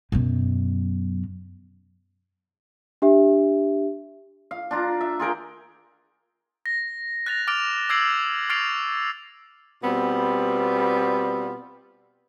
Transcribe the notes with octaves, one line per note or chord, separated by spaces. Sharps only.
F#2 B2
D4 G4 E5
F5
D4 F4 A#5
E5
F4 G#4 A#4 G5
A#6
F#6 A6 A#6 F7
D6 F6 A6 D7 F7
D6 E6 G#6 C7 D7 F#7
C#6 F6 A6 C7 D7 F7
B2 G3 B3 C4 F4